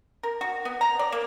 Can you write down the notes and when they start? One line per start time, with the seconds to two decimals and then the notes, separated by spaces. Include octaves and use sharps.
0.23 A#4
0.41 F#4
0.65 B3
0.81 A#5
0.99 D5
1.12 A#3